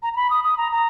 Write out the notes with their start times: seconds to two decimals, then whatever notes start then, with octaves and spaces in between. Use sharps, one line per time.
0.03 A#5
0.13 A#5
0.16 B5
0.30 D#6
0.44 D#6
0.57 A#5
0.72 A#5